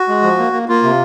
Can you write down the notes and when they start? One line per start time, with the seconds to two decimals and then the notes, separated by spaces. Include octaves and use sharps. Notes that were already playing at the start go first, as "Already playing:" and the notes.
Already playing: F#4
0.09 G#3
0.23 F3
0.38 A#3
0.53 A#3
0.69 A#3 F4
0.83 C3